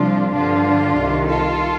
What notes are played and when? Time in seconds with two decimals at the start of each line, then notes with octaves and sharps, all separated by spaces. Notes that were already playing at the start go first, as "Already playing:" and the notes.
Already playing: C2 C3 F3 D4 F4
0.33 G2 D3 F3 D4 F4
0.96 C2 C3 D#3
1.27 F4 A4